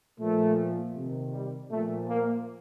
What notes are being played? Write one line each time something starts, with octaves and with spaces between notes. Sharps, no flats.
A#2 F3 A3
C3 D#3
G3
A#2 F3 A3
A#3